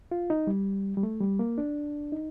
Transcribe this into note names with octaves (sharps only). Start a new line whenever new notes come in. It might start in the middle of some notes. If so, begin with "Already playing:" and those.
F4
D#4
G3
G3
A3
G3
A#3
D4
D#4